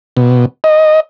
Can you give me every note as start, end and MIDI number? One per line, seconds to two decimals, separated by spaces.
0.17 0.45 47
0.64 1.00 75